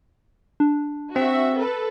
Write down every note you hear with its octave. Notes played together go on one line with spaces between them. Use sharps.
D4
C4 F#4 E5
A4 B4